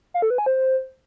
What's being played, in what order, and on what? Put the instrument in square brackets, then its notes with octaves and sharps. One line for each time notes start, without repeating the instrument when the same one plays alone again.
[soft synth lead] F5
A4
B4
G#5
C5